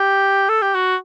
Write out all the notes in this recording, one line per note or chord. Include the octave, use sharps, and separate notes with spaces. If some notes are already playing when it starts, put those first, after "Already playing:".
Already playing: G4
A4
G4
F#4